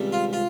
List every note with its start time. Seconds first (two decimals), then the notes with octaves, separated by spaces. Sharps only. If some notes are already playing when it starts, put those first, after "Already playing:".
Already playing: C#2 C3 D#3 G3
0.12 F4
0.33 F4